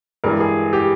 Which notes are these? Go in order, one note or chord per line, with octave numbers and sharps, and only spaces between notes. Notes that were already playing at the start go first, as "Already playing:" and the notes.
G2 E3 G#3 A#4
G#4
G4